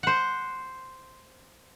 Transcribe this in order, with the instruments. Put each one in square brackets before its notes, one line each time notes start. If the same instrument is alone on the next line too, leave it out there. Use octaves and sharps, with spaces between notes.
[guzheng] C5 F#5